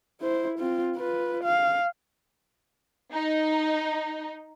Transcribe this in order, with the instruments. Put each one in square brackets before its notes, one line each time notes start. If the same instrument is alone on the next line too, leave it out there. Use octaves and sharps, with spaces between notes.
[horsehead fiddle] E4 C5
C4 F4
F4 B4
F5
[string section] D#4